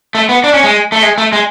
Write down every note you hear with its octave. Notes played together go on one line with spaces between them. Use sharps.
A3
B3
D4
C#4
G#3
A3
G#3
A3
G#3